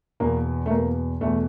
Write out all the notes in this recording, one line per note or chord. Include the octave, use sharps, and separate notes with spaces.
E2 B2 A#3
A3
E2 B2 A#3
E2 B2 A3